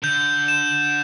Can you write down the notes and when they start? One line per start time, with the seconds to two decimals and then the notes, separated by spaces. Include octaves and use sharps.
0.03 D3 G6
0.48 E7